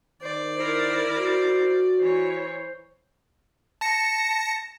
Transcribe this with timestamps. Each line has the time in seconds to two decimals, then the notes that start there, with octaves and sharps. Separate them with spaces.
0.22 D#3 C5 D5
0.57 E4 A#4 C5
1.15 F#4 C5
1.99 E3 C5 C#5
3.81 A5 A#6 C#7